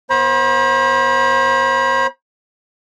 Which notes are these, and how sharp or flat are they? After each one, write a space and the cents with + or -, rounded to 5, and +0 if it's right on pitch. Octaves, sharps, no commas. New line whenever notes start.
B3 -25 C5 +35 B5 -40